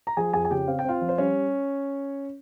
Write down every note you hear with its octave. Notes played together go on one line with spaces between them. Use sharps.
A#5
F3 G#4 G#5
F2 G#4 G#5
G#5
C#3 G4 G5
C4 F5
G5
C4 F4 F5
F3
C5
G3 C#4 C#5